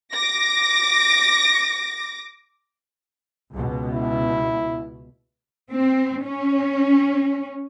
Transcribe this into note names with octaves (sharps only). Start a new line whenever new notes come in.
D6 A#6
C#2 B2
E4
C4
C#4